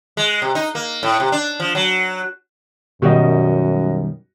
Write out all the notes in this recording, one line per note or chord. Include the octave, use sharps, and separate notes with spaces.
G#3
C3
D#4
A#3
A2
C3
D4
F3
F#3
F#2 B2 D#3 G3 F#4 D#5